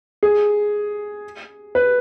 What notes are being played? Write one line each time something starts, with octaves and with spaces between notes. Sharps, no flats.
G#4
B4